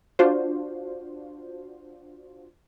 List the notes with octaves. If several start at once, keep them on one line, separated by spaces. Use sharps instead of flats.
D4 F4 F#4 C5